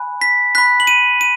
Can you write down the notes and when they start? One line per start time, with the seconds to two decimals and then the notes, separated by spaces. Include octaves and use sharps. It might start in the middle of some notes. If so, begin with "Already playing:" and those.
Already playing: G#5 B5 F#6
0.21 B6
0.55 B5 F#6 B6
0.80 F#7
0.87 D#7
1.21 D#7